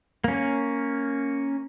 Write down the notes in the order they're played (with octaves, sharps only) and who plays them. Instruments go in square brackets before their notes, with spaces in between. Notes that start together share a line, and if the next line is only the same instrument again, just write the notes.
[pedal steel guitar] A#3 C#4